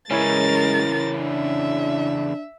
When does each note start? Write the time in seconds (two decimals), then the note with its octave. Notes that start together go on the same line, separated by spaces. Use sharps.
0.11 C#3 E3 G#3 C#4 E4 A#4 C#5 A6
1.18 D4 E5